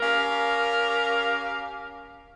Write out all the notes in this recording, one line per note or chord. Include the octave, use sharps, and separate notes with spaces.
C#4 G4 A#4 F5